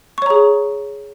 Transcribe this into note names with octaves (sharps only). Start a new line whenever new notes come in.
G#4 C#5 A#5 C#6